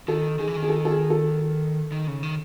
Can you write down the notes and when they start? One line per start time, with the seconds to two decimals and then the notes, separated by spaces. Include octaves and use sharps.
0.08 D#3 A4
0.39 D#3 G#4
0.47 E3
0.57 D#3
0.63 G#4
0.69 A4
0.85 A4
0.90 G#4
1.10 A4
1.92 D#3
2.07 C#3
2.23 D#3